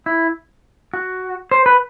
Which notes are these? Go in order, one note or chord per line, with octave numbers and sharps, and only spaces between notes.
E4
F#4
C5
B4